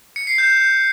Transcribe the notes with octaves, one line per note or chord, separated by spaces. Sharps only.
C#7
C7
G6